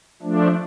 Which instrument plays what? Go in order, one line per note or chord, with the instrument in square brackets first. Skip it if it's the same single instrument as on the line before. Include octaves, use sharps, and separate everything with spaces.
[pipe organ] F3 A3 D4